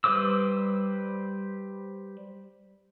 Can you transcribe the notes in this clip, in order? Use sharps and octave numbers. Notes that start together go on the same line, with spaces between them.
G3 B4 C5 D6 E6